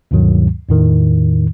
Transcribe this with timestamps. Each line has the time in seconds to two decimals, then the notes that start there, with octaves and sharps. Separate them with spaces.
0.11 D2 G2 B2 D#3 F#3
0.69 E2 A2 D#3